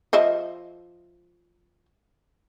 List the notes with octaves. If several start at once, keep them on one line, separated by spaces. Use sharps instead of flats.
F3 D#5 E5